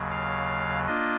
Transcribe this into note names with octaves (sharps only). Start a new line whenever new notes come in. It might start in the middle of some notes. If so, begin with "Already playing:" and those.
Already playing: D#2 C#3 F#3
F5
A#3 D4 F4 D#5